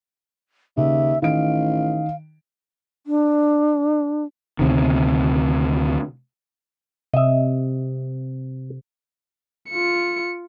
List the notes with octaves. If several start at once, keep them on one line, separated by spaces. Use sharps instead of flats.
D#2 C#3 E5
A1 D#3 D#5 F5 D7
D4
D2 C3 D#3
C3 D#5 E5
F4 C#7